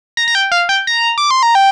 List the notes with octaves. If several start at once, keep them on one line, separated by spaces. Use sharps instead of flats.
A#5
A#5
G5
F5
G5
A#5
D6
C6
A#5
G5